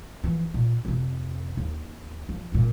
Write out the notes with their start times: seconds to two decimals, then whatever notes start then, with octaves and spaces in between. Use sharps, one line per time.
0.24 E3 F3
0.54 A#2
0.85 F2 C3
1.57 D#2
2.29 F3
2.52 G#1 A#2